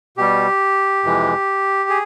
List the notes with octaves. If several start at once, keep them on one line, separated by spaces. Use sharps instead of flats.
B2 G3 G4
F2 C3 E3 G#3
G#4